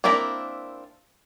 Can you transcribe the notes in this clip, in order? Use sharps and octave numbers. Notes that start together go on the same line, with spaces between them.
A#3 C4 D4 E4 A#5